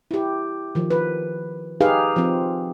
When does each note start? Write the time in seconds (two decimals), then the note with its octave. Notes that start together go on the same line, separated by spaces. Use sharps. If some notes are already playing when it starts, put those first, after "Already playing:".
0.11 E4 G4
0.75 D#3 F3
0.91 B4
1.80 D#4 G4 G#4 B4 F5
2.16 F3 C4